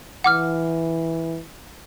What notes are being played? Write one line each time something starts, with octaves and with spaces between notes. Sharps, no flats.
E3 F#5 D6 F6